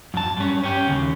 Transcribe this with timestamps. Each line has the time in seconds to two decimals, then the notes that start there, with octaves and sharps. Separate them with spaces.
0.14 F#2 A5
0.37 G2 C#4
0.64 C#4 G4
0.87 D#2 C#3